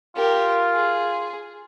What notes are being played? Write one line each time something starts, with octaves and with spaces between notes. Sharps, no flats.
F4 G4 A#4
G#4